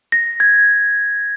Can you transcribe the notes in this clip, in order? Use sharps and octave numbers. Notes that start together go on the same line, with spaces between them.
A#6
G#6